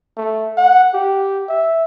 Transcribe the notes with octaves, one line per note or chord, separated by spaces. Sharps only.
A3
F#5
G4
E5